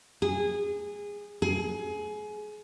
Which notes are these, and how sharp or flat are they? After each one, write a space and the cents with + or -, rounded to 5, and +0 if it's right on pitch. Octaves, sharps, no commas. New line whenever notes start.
G#4 -20
G#4 +25